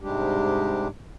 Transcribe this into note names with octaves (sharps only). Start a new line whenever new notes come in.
G#2 C3 G3 G#3 D4 G4